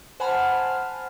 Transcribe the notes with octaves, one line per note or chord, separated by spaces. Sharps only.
C5 F#5 G#5 A5 B5 F6